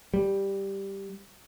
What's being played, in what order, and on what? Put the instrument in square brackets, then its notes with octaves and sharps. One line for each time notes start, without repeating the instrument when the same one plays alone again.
[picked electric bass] G3